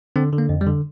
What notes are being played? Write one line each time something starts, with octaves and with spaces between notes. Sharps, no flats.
D3 C4
D3
A#3
F2
G3
D3